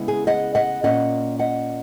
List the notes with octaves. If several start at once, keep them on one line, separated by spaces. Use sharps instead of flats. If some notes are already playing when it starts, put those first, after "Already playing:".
Already playing: C#3 G#3 B3 E4
G#4
D#5 F#5
D#5 F#5
A#2 A#3 C#4 D#5 F#5
D#5 F#5